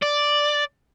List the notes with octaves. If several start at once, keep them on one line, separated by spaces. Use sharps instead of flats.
D5